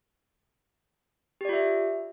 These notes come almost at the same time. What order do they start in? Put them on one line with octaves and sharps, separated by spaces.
G4 D5 F4 E5